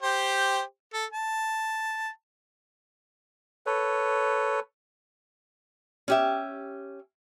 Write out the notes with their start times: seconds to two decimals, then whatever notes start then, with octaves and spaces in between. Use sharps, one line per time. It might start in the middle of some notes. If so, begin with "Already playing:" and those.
0.02 G4 C5
0.94 A4
1.12 A5
3.66 A4 B4 C#5
6.08 C#4 G4 E5